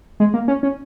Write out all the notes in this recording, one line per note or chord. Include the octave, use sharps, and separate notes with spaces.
G#3
A#3
C#4
C#4